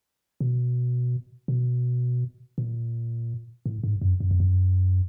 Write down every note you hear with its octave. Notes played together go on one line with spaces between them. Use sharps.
B2
B2
A#2
A2
G#2
F#2
F#2
F2
F#2